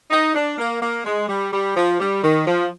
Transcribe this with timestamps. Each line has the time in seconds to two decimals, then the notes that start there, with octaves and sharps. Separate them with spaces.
0.11 D#4
0.35 D4
0.58 A#3
0.82 A#3
1.05 G#3
1.28 G3
1.53 G3
1.76 F3
2.00 G3
2.24 D#3
2.47 F3